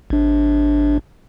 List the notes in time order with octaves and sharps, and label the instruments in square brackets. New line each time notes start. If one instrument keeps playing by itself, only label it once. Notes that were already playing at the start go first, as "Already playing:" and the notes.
[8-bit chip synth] G#1 D4